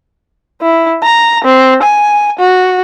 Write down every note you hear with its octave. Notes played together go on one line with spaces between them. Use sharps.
E4
A#5
C4
G#5
F#4